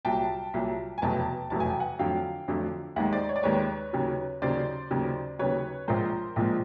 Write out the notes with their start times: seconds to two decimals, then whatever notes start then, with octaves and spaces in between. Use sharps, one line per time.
0.05 C2 A#2 F#3 G5 A5
0.54 C2 A#2 F#3
0.98 G#5
1.02 F1 E2 B2 F#3 A3 G5 A5
1.50 F1 E2 B2 F#3 A3 A5
1.60 G#5
1.70 G5
1.80 F#5 G#5
1.99 F2 D3 F#3 A3 F5 G5
2.48 F2 D3 F#3 A3
2.96 D#2 D#3 G#3 E5 F#5
3.12 C5 D5
3.29 C#5
3.36 D5
3.43 D#2 D#3 G#3 B4 C#5
3.93 D#2 C#3 F#3
4.42 D#2 C#3 F#3 C5 D5
4.90 D#2 C#3 F#3
5.39 D#2 C#3 F#3 B4 C#5
5.88 A#1 A#2 F3 G#3 A#4 C5
6.36 A#1 A#2 F3 G#3